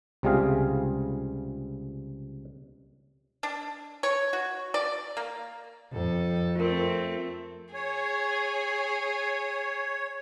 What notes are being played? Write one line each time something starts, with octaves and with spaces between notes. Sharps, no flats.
C#2 C3 G3 F4 G#4 F5
D4
C#5
F#4
D5
A#3
F2 A4
A3 C4 F4 A#4
G#4 C#5